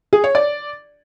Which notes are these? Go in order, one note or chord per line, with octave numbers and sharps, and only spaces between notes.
G#4
C#5
D5